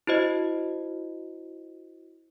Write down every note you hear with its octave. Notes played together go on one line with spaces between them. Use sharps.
E4 F#4 C5 D#5